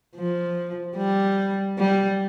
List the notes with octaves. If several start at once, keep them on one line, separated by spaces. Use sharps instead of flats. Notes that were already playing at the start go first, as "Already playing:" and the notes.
F3
G3
G3